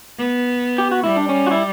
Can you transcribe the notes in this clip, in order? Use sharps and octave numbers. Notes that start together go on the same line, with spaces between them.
B3
G4
F#4
G3 E4
D4
C#4
F#4
E4